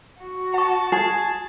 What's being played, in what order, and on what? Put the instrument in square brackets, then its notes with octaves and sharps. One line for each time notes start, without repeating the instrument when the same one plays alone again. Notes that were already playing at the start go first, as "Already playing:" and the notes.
[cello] F#4
[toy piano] F#5 C#6 [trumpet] A5
[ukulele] G#4